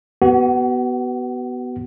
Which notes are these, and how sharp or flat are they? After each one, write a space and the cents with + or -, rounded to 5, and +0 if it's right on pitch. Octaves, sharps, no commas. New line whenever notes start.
B3 +0 F#4 +35